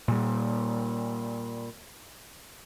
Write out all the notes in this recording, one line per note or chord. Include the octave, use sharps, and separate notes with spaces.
A#2 G3